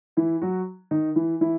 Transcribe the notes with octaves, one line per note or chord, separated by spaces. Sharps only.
E3 E4
F#3 F#4
D#3 D#4
E3 E4
E3 E4